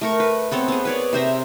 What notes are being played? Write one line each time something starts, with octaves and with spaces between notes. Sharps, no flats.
A3 A#4 C#6
B4
B3 C4 A4 C#5
B3 G#4
B4 C#5 D5
C3 C5 E5 A#5